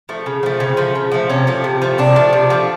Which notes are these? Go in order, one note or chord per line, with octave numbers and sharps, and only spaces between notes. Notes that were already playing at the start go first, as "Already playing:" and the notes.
F3 A3
C#3
F3 A3
C#3 C4
F3 A3
C#3
F3 A3
C3 C#4
F3 A3
C3
F3 A3
C3 D4
F3 A3
C3
F3 A3